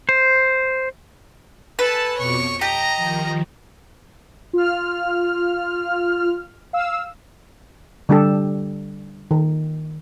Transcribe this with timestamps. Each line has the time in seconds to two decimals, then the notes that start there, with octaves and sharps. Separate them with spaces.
0.09 C5
1.79 A4 B4 G#5 A5
2.18 F2 B2 C#5 C#6 D6
2.61 G4 D#5 A5 A#5
2.95 D#3 F3
4.53 F4 F6
6.73 F5 E6
8.09 D3 G3 D4 G4 A4
9.31 D#3